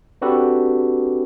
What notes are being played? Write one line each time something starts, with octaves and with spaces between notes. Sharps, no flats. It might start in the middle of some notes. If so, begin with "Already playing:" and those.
C4 D4 F#4 G4 A4 B4